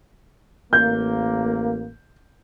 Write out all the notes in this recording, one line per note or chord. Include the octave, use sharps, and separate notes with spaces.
A1 A#3 G6